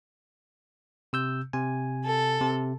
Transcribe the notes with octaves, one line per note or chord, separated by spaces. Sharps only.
C3 E6 G6
C3 G#5
A4
C3